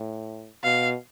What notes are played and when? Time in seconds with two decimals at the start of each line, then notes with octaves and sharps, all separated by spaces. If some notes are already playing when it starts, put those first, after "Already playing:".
Already playing: A2
0.64 B2 F5